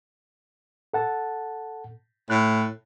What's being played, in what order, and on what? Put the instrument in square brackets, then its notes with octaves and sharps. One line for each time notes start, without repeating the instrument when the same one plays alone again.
[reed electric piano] A4 F#5 A5
[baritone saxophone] A2 [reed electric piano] F#6